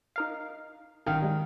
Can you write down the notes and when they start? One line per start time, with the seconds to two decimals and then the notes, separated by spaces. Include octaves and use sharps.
0.16 D#4 A#4 F5
1.06 G#1 D#3 F5
1.22 G3 G#3